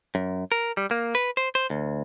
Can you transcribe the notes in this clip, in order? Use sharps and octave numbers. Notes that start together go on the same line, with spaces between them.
F#2
A#4
G3
A#3
B4
C5
C5
D2